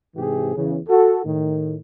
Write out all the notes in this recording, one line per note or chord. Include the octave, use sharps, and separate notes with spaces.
G#2 C3 E3 G4 G#4
E2 C#3
F#4 A4
A2 D#3